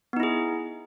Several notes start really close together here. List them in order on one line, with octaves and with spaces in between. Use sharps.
B3 D#4 E4 G#4